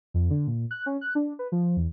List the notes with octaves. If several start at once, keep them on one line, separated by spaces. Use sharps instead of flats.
F2
D3
A#2
F#6
C#4
F#6
D4
B4
F3
E2